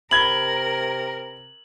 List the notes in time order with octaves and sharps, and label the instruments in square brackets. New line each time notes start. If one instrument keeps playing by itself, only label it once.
[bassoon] C3 [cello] A#4 [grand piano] B5 G#6 G7 [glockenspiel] F#7